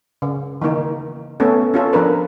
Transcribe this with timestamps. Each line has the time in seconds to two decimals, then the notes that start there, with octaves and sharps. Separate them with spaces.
0.22 C#3
0.61 D#3 E3 A#3 D#4
1.40 A3 B3 C#4 A4
1.74 C#4 F4 A4
1.93 F3 D4 A#4 B4